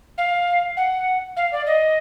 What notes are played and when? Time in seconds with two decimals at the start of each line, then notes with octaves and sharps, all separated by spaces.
0.18 F5
0.77 F#5
1.37 F5
1.52 D5
1.67 D#5